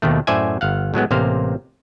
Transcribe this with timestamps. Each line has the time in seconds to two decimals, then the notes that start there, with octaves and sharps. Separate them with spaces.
0.02 D#2 B2 D#3 A3
0.27 F#2 A2 C5 D5 E5 G#5
0.61 G1 F5 F#5
0.94 A2 F#3 G#3 B3
1.11 A1 C3 A#3 C5 F5